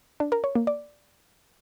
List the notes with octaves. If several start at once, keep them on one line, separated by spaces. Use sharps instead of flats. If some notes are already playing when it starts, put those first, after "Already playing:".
D4
A#4
C#5
A#3
D5